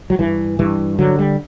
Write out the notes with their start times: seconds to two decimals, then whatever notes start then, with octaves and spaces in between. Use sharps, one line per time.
0.10 F#3
0.19 G2 E3
0.59 G2 E3
0.98 D3 F#3
1.19 G3